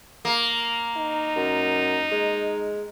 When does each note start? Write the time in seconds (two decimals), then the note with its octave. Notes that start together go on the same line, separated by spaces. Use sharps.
0.25 A#3
0.97 D#4
1.36 F#2
2.12 G#3